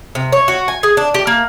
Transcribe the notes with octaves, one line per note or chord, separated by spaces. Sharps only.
C3
C#5
F#4
G#5
G#4
D4
G4
A#3